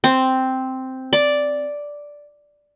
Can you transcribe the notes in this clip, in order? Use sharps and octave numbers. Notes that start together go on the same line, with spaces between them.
C4
D5